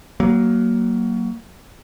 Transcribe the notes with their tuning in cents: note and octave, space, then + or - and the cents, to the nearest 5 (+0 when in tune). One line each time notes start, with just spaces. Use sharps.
F#3 +20 A#3 +0